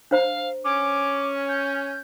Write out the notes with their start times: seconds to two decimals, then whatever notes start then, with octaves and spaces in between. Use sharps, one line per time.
0.11 D4 C5 F5 A#5
0.65 C#4 D6
1.49 G6